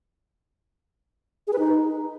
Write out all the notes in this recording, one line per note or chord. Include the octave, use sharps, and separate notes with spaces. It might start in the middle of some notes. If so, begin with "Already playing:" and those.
G#4
B4
D#4